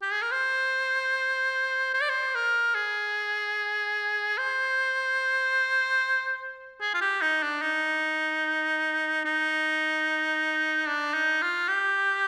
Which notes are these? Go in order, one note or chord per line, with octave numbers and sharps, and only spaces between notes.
G4
G#4
A#4
C5
C5
D5
C5
A#4
G#4
C5
G#4
F4
G4
D#4
D4
D#4
D#4
D4
D#4
F4
G4